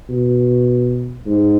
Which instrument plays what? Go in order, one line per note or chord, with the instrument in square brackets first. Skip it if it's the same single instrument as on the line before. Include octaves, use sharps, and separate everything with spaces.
[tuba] B2
G#2